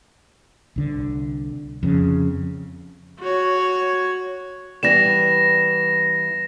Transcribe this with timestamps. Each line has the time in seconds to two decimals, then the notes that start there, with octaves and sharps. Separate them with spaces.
0.76 C2 D3
1.83 F2 C#3
3.19 F#4 C#5
4.83 E3 G3 B3 A#6 E7